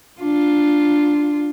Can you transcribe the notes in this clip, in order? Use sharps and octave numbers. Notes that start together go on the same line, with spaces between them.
D4 F4